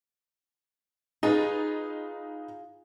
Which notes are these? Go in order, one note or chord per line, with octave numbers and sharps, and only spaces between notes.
D#4 F4 G#4 B4